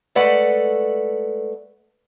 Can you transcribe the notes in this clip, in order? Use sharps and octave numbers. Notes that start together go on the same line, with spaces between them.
G#3 A3 A4 B4 D5 F#5